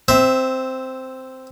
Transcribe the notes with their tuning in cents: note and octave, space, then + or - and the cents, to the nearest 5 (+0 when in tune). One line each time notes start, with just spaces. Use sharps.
C4 -5 E5 +0